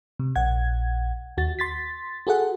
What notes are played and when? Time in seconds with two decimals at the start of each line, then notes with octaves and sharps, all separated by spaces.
0.20 C3
0.36 A#1 F#5 G#6
1.37 D#2 F#4 A6
1.59 C6 A6 B6
2.27 F#4 G#4 A4 F#5